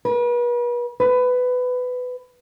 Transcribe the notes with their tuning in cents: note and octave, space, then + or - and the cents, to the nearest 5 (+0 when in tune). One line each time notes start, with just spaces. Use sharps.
B4 -40
B4 +15